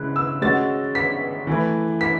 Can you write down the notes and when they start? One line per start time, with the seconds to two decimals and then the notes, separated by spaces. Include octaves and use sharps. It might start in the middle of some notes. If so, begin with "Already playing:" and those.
Already playing: C#3 G#3 E4 F#6
0.16 E6
0.42 G#3 C#4 F#4 A6
0.95 B6
1.47 E3 A3 E4 B4
2.01 B6